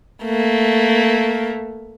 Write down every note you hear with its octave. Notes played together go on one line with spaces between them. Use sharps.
A3 A#3